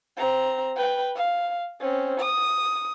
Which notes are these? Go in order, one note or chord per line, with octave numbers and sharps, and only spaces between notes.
C4 A#5
B4 G5
F5
C4 C#4
D#6